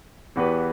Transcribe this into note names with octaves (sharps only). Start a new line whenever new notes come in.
E2 E3 B3 G4 B4